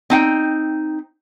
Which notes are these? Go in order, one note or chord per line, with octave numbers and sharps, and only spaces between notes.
C4 D#4 G5